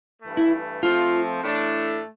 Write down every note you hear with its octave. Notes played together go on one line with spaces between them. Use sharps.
G2 E3 A3
E4
F3 A3 C4 F4
A2 E3 A3 D4